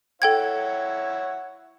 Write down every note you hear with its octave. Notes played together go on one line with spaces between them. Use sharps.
E4 A4 C#5 F#5 G5 G#6